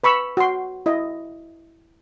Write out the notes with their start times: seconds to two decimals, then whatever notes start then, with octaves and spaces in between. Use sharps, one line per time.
0.04 B4 B5 C#6 E6
0.37 F#4 C6
0.86 E4 D#5